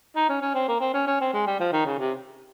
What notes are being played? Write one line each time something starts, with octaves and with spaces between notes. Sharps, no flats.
D#4
C#4
C#4
C4
A#3
C4
C#4
C#4
C4
G#3
G3
F3
D#3
C#3
C3